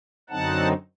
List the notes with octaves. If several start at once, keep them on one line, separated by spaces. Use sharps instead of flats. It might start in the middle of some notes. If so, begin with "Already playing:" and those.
F#2 D3 F#3 C4 D#4 F#5 A5